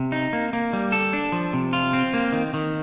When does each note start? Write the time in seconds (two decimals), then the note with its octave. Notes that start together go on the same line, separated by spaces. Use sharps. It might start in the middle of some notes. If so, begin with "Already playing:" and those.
Already playing: C3
0.12 D#4
0.33 A#3
0.53 A#3
0.73 G3
0.92 A4
1.13 D4
1.32 F3
1.53 C3
1.73 F4
1.93 C4
2.14 A#3
2.32 D#3
2.54 D#3